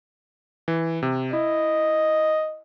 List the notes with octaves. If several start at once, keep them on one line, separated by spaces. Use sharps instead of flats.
E3
C3
E4 D#5